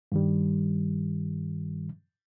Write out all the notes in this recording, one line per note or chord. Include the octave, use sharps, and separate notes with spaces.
G2 D#3 G3